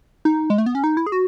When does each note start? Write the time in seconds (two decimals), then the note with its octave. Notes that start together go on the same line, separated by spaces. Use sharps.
0.25 D#4
0.50 G#3
0.58 A3
0.66 B3
0.75 C#4
0.84 D#4
0.97 E4
1.07 G#4
1.12 F#4